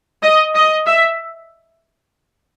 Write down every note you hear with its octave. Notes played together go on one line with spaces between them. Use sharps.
D#5
D#5
E5